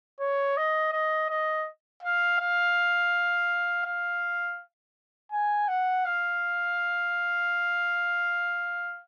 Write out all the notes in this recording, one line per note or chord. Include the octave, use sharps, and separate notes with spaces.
C#5
D#5
D#5
D#5
F5
F5
F5
G#5
F#5
F5